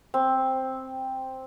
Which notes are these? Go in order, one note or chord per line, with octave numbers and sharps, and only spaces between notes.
C4